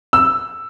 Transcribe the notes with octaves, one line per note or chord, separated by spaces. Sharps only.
E6